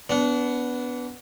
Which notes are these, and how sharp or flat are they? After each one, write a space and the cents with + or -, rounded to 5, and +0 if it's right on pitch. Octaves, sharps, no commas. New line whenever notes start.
B3 +0 D4 -30